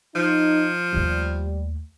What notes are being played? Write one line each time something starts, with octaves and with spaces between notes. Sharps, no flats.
F3 D#4
D#2 G3 A3